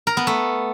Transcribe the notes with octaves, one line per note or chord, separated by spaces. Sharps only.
A#4
B3
A3